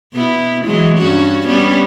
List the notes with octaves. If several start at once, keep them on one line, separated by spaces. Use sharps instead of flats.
B2 B3 E4
E3 F#3 G#3
G2 C#4 F#4
G3 B3 C#4